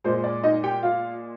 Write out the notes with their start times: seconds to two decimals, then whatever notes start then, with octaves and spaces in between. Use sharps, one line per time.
0.04 A#2 G#3 C5
0.24 D5
0.44 D#4 D#5
0.63 G4 G5
0.83 F4 F5